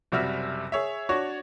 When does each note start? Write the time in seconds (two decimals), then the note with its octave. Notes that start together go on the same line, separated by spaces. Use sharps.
0.12 F#1 C3 G3 F#4 E5 F6
0.72 G#4 C#5 E5
1.09 D4 F#4 C#5 C#6